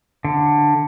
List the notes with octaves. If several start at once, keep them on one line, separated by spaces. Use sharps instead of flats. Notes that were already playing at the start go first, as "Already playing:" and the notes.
D3